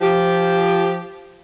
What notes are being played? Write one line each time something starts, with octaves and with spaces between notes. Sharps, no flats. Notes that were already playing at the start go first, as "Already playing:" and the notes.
F3 G4